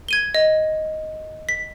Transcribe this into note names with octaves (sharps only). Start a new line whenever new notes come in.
G#6 D#7 G7
D#5
B6